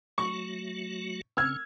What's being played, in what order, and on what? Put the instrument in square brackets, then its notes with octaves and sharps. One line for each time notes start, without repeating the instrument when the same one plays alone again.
[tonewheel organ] F#3 A3 F#4 [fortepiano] C#6
[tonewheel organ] C#3 C#4 [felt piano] E6 F6 G#6